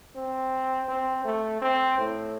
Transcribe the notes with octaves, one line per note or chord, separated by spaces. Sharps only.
C4
C4
A3
C4
A2